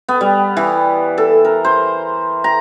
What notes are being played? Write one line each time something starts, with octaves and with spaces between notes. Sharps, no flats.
B3
G3
E3
A4
A#4
C5
A#5